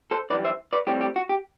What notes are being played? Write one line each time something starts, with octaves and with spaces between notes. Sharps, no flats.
A4 C5
F#2 E3 G3 B4 D5
C5 E5
B4 D5
A2 G3 C4 G4
G4
F#4
G4